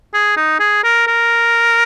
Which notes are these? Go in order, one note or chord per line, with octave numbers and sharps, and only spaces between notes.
G#4
D#4
G#4
A#4
A#4